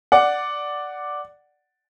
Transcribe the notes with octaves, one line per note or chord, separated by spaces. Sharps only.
D5 F#5